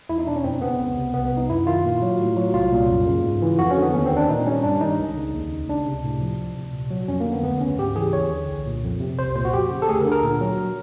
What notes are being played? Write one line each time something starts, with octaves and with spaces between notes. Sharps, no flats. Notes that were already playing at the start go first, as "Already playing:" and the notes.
E2 E4
D#4
B2 D4
C#4
F2 C4
C#3 B3
C#2
C3
C2 B3
B3
C3 D#4
F#2 E4
D#3 F4
A#2
F#3
A2
F#3
C2 F4
A#2
F#2
C#3
G#2
E3
F2 F#4
C#4
D3
B3
D#2 C#4
C4
D#3
D4
A#2 D#4
G3 C#4
G2 D4
D#3 D#4
C#2
C#3
D#2
C#3
C#2 D4
C3
A2
F3
D2
C3
A#2
F#3
F2 C#4
A#3
D3
B3
D2 B3
C#3 C#4
G#2 G4
E3 G#4
D#2 C#5
D3
C2
A#2
F2
C3
C2 C5
A#2 C5
F#4
F2 G4
C#3
A4
D2 G#4
A#4
D3
A#4
A#2
F#3